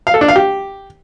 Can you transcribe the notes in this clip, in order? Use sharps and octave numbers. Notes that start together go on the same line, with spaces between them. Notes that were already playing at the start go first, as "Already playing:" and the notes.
F5
A4
D4
F5
G4